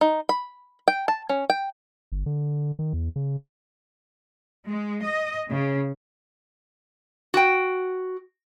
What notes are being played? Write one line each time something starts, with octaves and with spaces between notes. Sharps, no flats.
D#4
B5
G5
A5
C#4
G5
G1
D3
D#3
E2
C#3
G#3
D#5
C#3
F#4 G5